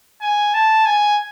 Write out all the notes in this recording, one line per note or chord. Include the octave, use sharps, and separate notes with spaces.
G#5
A5
G#5